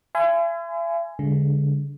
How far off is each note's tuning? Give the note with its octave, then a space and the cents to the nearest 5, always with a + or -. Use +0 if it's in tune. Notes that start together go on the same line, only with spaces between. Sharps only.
E5 +45 G#5 +5 C6 -45
D3 -35 G#3 -25